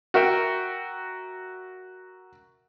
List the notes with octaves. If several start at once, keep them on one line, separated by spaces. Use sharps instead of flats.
F#4 A#4 E5 G5